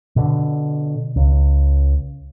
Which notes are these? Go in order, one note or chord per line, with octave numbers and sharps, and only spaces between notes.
B2 D3
C#2